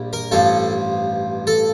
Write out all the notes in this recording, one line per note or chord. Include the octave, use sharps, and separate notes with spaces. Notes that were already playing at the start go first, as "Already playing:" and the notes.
Already playing: A#1 G3
A#4
A1 G2 F3 A4
A4